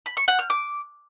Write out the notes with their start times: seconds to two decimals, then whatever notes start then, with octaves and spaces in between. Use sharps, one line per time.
0.06 B5
0.17 C#6
0.28 F#5
0.39 F6
0.50 D6